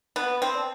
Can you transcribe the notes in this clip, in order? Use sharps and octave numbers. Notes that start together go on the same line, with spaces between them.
B3 B4
C4
D5 A5